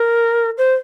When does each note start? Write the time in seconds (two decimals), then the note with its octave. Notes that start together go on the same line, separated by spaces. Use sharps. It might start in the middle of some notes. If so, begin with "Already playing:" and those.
Already playing: A#4
0.58 C5